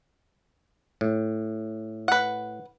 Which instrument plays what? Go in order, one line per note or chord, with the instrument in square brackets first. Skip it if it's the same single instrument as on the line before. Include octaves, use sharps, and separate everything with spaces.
[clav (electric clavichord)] A2
[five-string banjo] B4 F#5